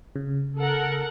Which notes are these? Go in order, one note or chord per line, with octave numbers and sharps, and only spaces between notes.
C#3
A4 A#4 F#5